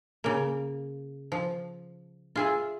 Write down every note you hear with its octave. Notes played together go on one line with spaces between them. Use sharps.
C#3 A#3
F3
F4 G#4 E5